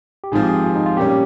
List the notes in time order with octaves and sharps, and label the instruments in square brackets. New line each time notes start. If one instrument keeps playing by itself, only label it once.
[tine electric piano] G4
[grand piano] G#1 G#2 F3 C4 [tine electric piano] G#4
[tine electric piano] G4
G#4
F4
D#4
F4
[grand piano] A#2 G3 A#3 C#4 [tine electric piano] G4